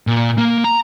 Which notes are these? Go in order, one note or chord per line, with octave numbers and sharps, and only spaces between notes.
A#2
A#3
A#5